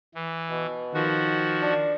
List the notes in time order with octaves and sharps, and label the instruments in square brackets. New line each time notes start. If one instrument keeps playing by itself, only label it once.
[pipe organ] E3
[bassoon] B2
[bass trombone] D#3 [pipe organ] F3 F#4
[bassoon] D4